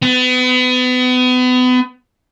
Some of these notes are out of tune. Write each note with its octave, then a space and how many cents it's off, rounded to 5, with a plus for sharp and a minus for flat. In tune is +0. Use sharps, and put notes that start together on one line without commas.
B3 +35